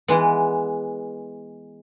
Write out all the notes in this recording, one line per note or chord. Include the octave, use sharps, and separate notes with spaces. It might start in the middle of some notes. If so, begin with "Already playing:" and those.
E3 G#3 B3